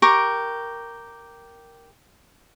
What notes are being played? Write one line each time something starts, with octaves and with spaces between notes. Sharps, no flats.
G4 A#4 C#6 D6